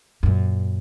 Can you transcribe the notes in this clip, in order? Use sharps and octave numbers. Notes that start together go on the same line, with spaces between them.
F#2 A#2